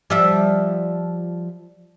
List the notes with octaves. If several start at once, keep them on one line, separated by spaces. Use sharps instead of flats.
F3 G3 E5